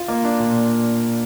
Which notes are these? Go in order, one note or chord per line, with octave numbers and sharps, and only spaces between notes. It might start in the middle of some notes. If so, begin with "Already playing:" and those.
Already playing: F4
A#3
D4
A#2